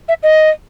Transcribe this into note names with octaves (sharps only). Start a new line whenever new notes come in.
E5
D#5